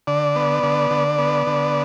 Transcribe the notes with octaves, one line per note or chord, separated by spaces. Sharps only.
D3 D5
B3
D3
D3
B3
D3